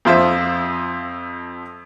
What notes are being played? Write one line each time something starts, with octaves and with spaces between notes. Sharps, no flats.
F2 F3 F4 C5 E5